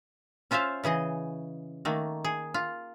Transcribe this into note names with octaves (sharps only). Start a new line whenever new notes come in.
C#4 F4 C5 E5 F5
C#3 E3 G#4 D#5
D#3 A3 A#3
G#4
F4